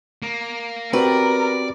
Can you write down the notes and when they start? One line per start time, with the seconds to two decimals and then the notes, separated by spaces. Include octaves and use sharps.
0.22 A#3
0.93 C4 F#4 G4 A#4 B4 D5